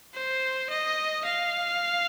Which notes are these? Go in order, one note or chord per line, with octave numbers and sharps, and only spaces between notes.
C5
D#5
F5